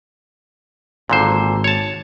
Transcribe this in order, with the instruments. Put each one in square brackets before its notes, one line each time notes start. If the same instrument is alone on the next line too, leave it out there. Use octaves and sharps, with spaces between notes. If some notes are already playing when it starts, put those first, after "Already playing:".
[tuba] G#1 [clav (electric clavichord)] A#2 D3 C5
[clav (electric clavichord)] C#5 A5